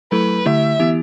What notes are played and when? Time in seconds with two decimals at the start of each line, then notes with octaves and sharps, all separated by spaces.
0.12 F#3 A3 E4 A4 B4
0.46 D3 A3 E4 G4 E5
0.80 E3 B3 E4 G4